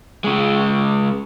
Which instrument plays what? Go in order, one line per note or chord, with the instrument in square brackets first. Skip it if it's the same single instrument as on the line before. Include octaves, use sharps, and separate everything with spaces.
[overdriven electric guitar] C#3 G#3